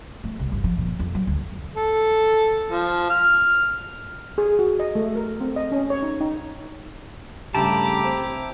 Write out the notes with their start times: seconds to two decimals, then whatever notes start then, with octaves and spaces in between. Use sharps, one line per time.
0.24 A3
0.39 C2
0.52 G1
0.64 F3
0.78 A#2
0.99 F2
1.15 F#3
1.27 D2
1.76 A4
2.72 F3
3.10 F6
4.38 G#4
4.59 F#4
4.80 D#5
4.95 A3
5.16 A#4
5.41 C4
5.56 D#5
5.72 C#4
5.90 C#5
6.03 D#4
6.21 D#4
7.55 G2 C#3 A3 E4 G4 A5 A#5 D6
8.04 C4